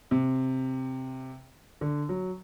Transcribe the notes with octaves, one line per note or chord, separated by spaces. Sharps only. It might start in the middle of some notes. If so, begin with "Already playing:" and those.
C3
D3
F#3